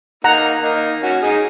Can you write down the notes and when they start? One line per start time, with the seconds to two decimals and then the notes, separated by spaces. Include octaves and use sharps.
0.24 A#3 D#4 F#5 A#5
0.63 A#3 D#4
1.03 C#4 F#4
1.22 D#4 G#4